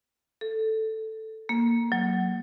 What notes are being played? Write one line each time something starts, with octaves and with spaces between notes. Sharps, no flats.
A4
A#3
F#3